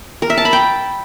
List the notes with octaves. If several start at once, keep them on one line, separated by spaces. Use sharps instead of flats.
A#4
E5
A5
B5
G5